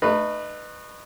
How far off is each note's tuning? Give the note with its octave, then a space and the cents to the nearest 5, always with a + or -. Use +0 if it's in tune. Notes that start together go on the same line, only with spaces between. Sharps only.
A3 -10 D#4 -35 B4 +0